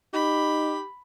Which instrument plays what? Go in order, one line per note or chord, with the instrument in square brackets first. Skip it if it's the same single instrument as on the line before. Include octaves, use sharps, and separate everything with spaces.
[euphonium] D#4 [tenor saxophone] G4 [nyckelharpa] B5